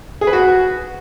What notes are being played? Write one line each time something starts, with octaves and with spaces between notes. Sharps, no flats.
G#4
B4
F#4